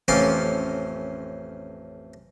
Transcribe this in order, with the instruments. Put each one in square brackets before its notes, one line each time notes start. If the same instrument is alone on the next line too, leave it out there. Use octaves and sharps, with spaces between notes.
[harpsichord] A1 F2 C#4 F4 C6 D6